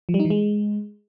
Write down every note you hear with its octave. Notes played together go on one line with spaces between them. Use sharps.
F3
G3
D#4
E3
G#3